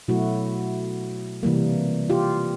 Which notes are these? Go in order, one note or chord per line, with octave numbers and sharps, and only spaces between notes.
B2 F#3 A3 E4 F#4
C3 E3 G3 A#3
F4 G4